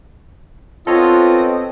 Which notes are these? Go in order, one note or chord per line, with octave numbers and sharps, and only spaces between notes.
B3 C4 F4 A4 C#5 D#5